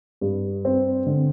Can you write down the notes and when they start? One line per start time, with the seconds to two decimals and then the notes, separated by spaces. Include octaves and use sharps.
0.21 G2
0.65 C4
1.06 D3